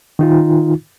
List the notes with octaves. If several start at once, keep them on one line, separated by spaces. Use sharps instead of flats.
D#3 D#4 F4